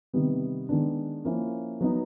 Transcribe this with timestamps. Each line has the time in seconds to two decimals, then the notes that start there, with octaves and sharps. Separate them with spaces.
0.13 C3 D#3 G3 B3
0.69 D#3 G#3 B3 D4
1.25 F3 A#3 C#4 E4
1.81 F#3 B3 D#4